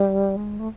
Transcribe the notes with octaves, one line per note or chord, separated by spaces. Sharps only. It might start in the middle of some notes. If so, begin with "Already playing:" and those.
Already playing: G3
G#3
A3